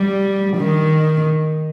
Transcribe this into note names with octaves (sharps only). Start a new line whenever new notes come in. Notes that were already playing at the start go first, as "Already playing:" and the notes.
Already playing: G3
D#3